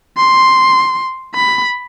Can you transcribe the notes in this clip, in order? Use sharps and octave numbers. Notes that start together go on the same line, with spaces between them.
C6
B5